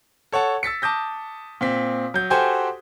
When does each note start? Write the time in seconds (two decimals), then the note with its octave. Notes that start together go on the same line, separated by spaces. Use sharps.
0.32 A4 C#5 F#5 A5
0.63 E6 A6 B6 C#7
0.82 A5 D6 D#6 G6 A#6
1.61 A#2 C4 B6
2.14 F#3 G6
2.30 F#4 G4 A4 C5 G5 G#5